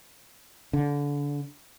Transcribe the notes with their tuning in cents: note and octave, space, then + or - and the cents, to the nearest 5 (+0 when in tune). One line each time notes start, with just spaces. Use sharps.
D3 -30